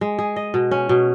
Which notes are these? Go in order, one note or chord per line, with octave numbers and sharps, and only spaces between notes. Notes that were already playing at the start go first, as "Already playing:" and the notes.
G#3
G#4
D#5
B2
C#4
B2